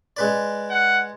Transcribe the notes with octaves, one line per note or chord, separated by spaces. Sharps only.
G#3 B4 D5
F#5